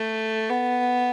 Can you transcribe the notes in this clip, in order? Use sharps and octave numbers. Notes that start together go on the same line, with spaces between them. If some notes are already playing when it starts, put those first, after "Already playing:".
Already playing: A3
B3